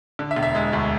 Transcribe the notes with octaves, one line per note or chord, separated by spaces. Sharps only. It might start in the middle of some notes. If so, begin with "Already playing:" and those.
D3
E5
E1
E5
G#3
D2